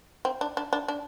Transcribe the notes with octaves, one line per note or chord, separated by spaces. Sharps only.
C4
D4
D4
D4
D4